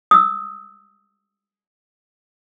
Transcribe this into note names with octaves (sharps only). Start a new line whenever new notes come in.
D#6 E6